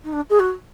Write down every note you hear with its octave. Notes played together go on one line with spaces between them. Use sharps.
D#4
D4
G#4
F#4